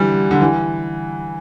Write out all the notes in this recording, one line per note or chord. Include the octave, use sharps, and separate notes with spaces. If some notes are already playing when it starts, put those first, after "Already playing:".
Already playing: D3 E3 G3
D3
E3